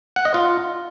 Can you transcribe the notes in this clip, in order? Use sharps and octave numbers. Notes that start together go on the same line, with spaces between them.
F#5
D#5
F4